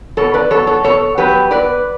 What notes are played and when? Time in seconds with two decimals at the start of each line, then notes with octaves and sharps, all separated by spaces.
0.17 B2 A4 C#5
0.34 B4 D5
0.50 F#3 B3 A4 C#5
0.67 A4 C#5
0.84 B2 A4 C#5
1.17 F#3 B3 G4 B4
1.51 B2 B4 D5